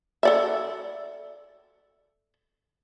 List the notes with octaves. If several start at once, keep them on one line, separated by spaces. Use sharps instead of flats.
A4 D5 E5